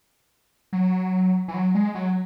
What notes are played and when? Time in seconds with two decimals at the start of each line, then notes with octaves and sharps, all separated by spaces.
0.73 F#3
1.48 E3
1.54 F#3
1.75 G#3
1.95 F#3